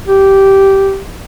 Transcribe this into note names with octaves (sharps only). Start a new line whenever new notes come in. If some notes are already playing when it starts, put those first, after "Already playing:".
G4